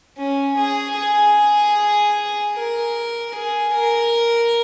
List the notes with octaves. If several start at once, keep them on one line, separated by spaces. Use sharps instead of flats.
C#4
G#4
G#4
A#4
G#4
A#4